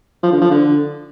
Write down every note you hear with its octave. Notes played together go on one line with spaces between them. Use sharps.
F3
D3
F3
D3